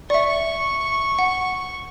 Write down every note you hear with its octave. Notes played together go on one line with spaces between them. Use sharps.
D5 E5 C#6
F#5